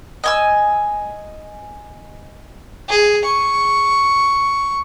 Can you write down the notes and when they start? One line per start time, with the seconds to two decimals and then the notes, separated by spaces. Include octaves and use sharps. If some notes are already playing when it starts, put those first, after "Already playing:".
0.24 D#5 G#5 E6
2.89 G#4
3.25 C#6